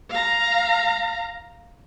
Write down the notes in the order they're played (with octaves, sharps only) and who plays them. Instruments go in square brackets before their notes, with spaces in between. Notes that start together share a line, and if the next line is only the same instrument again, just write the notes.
[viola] F5 A#5